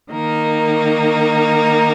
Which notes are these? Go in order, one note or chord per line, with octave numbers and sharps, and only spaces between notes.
D#3 A#3 D#4 A#4